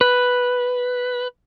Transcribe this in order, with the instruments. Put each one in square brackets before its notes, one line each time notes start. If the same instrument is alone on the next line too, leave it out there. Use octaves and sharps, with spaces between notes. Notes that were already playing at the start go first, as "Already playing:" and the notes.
[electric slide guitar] B4